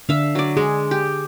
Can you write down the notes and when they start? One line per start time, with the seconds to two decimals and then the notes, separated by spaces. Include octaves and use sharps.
0.09 D3 D4 E5 F5
0.35 F#3 D5
0.57 G#3 G#4
0.91 G4